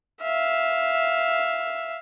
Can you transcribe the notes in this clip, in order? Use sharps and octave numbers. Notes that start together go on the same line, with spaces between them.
E5 F5